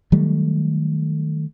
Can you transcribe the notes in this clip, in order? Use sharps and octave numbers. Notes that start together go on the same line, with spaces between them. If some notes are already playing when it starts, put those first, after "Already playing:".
D#3 F#3 G3 A3